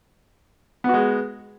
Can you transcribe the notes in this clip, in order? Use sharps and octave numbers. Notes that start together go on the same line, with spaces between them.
G#3 B3 F#4